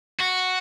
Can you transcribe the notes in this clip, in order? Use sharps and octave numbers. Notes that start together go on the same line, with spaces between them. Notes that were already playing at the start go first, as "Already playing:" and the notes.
F#4